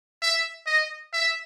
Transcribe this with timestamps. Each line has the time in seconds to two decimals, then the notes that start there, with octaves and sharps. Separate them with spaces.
0.22 E5
0.66 D#5
1.13 E5